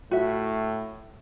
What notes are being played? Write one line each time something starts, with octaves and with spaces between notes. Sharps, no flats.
A2 F#4 E5